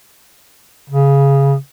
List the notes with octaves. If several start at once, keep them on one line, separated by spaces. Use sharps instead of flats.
C#3